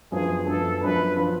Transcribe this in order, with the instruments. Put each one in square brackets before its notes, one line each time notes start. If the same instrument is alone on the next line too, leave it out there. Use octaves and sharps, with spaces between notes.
[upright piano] F#2 F3 B3 D4 [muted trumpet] G#4
[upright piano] F#2 F3 B3 D4 [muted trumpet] A4
[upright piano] F#2 F3 B3 D4 [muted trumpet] B4
[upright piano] F3 B3 D4